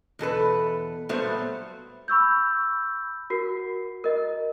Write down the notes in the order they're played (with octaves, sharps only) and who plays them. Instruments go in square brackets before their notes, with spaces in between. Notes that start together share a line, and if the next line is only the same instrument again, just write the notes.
[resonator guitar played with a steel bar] E2 B2 A4 B4
A#2 F#3 G3 A3 B3 C5
[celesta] B5 C#6 E6 G6
F#4 A#4 C7
A#4 D#5